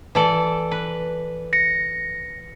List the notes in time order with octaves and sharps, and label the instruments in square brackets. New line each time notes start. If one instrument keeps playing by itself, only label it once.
[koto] E3 A4 D5
B4
[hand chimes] A#6 C#7